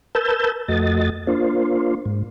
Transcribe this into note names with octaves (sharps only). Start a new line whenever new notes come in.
A#4 B4 A5 E6 G6
F2 A3 F#4 D#5 A6
A#3 D4 F4 C5
G#2